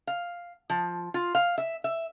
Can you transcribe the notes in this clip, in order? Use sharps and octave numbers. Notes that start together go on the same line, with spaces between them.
F5
F3
F4
F5
E5
E5